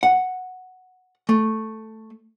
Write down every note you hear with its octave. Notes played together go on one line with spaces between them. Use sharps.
F#5
A3